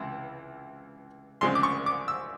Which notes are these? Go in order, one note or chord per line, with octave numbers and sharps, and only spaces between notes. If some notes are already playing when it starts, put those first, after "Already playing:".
Already playing: C#2 C3 E3
D2 C#3 F3 G#3 C4 C6
D6
C#6
D6
E6